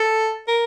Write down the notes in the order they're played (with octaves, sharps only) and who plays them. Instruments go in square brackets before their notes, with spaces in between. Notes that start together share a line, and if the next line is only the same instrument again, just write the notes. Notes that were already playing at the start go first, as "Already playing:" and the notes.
Already playing: [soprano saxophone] A4
A#4